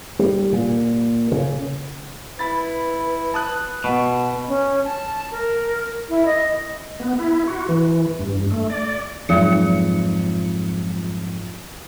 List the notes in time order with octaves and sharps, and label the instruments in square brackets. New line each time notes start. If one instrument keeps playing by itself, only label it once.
[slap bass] G3
A#2
C#3
[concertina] E4 [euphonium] B4 [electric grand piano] B5 A6
[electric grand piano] A5 D#6 F#6
[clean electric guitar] B2
[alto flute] C#4
A5
A#4
E4
D#5
[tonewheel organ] B3
E4
F#4
E3
G2
A3
D5
[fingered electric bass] F2 G#2 [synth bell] F#3 F4 C#7